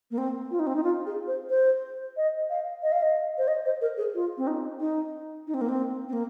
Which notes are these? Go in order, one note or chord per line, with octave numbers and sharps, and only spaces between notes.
A#3
C4
F4
D#4
C4
D#4
F4
G#4
C5
C5
D#5
F5
D#5
F5
D#5
C5
D#5
C5
A#4
G#4
F4
C4
D#4
D#4
D#4
C4
A#3
C4
C4
A#3